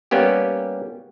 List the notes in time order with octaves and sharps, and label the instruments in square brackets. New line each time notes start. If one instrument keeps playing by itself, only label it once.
[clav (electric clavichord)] G3 A#3 B3 C#4 G4